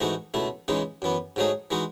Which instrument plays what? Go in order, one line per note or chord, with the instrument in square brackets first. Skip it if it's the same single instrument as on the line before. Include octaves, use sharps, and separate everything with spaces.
[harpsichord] G#2 E3 A3 D#4 F#4
C#2 B2 A3 E4
C#2 C#3 E3 G#3 D#4
F#2 E3 B3
G#2 F#3 A3 D#4 G#4
E3 G#3 D#4 F#4